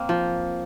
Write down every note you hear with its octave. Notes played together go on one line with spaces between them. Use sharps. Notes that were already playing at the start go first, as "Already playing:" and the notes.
Already playing: A#3 C4
F3